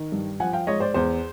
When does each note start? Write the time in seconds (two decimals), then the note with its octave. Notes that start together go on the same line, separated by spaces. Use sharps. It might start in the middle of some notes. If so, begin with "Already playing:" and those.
Already playing: D#3
0.12 G2
0.40 F3 F#5 G#5
0.53 F5 G5
0.67 G#2 C#5 D#5
0.80 C5 D5
0.94 E2 C5